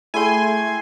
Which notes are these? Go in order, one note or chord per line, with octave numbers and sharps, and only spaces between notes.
A3 E4 G#4 G5 G#5 C6